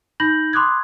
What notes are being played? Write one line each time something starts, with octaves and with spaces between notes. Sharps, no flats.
D#4 B5 G6 A#6 F#7
B5 C6 D6 D#6 F#6 G#6